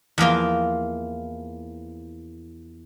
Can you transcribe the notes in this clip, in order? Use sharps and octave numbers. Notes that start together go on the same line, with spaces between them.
E2 F3 A#3 F4